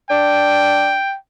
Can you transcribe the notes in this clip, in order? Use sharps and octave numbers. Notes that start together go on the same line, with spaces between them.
D4 G5